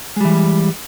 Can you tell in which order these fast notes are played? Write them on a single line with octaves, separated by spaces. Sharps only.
G#3 G3 E3